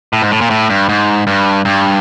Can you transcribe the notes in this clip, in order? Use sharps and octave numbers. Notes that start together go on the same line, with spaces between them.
A2
G#2
A2
A#2
A2
G2
G#2
G2
G2